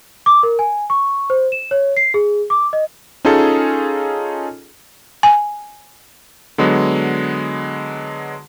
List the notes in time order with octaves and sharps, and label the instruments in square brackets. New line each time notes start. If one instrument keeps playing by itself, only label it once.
[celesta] D6
A#4
G#5
C#6
C5
E7
C#5
C7
G#4
D6
D#5
[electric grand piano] C#4 D#4 F4 G#4 A4
[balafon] G#5
[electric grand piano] D3 F#3 G#3 B3